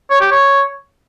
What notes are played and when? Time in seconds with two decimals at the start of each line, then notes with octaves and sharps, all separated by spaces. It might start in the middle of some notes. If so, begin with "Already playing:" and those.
0.10 C#5
0.21 G4
0.31 C#5